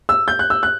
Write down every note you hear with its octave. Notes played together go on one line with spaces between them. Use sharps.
E6
G6
F#6
E6
F#6